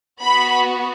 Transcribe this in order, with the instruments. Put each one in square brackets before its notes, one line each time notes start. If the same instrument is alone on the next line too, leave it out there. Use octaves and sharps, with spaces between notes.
[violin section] B3 F#4 B5